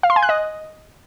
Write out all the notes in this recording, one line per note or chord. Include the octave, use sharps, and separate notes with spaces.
F5
C6
G#5
F#6
D#5